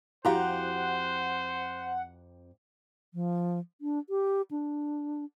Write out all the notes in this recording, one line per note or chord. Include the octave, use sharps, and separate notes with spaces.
F2 E4 F#4 G4 C5 F5 F#5 A#5
F3
D4
G4
D4